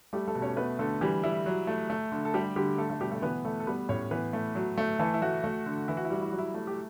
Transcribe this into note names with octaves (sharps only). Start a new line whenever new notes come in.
G3 A3 G4
A3 A4
B2
C#4 C#5
A3 B3 B4
D3 A3 A4
E3 G3 G4
G3 E4
F#3
A3
A3
D3
A4
G3 G4
D3 G3 G4
A3 A4
A3 A4
B2 G3 G4
A3 A4
E3 B3 B4
A3 A4
A4
G3 B3 B4
A2 C#4 C#5
E3 B3 B4
A3
F#3
A3
E3 A3 A4
E4
A3 F#4
A3
D3
E3 E4
F#4
E4
G3 F#4
E4
F#3 F#4
E4
A3
G4